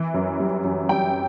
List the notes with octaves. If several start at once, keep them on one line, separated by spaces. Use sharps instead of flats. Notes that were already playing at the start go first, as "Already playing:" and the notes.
Already playing: E3
F#2
G3
F#2
G3 G5